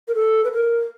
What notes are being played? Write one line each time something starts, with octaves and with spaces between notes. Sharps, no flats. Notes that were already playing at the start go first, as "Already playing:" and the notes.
A#4
A4
B4
A#4